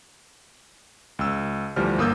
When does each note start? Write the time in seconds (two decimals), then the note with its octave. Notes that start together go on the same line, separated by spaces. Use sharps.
1.19 C#2 E6
1.76 D2 E3 F3 G3 F6
1.98 G1 A#3 D#6 E6 G6